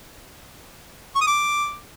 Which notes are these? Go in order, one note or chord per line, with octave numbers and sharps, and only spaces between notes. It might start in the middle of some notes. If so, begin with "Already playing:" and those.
C#6
D#6
D6